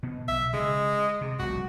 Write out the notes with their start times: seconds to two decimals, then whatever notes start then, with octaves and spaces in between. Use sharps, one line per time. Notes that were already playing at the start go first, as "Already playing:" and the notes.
0.03 B2 B3
0.28 B1 E5
0.53 C#3 G#3
1.21 C3
1.39 F1 C2 A3 F#4